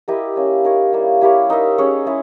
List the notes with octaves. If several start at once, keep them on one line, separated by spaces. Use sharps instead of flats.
E4 G4 A#4 D#5
A#3 C#4 E4
D#4 A#4 C#5
G3 A#3 E4
E4 G4 A#4 C#5
D#4 A#4 E5
C#4 G#4 C#5
G#3 C#4 E4